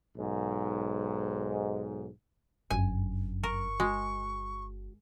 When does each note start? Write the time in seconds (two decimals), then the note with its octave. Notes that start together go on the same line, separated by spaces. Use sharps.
0.18 B1 G#2
2.71 G1 F#2 G#5
3.43 A#4 C#6
3.80 G#3 F#4